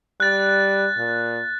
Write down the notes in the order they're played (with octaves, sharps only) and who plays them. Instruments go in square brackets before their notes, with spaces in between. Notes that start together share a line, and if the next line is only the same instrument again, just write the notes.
[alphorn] G3 [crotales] F#6 A6
[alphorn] A#2